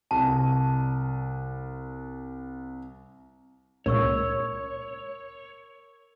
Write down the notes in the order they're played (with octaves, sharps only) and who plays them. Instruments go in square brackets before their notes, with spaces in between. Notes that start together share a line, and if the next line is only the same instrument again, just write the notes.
[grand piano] C2 [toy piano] A5
[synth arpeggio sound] C#2 A#2 [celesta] A#4 C#6 E6 [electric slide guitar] C#5